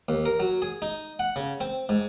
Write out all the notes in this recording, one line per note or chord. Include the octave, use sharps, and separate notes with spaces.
D#2
A#4
F#3
G#4
D#4
F#5
C#3
C4
G#2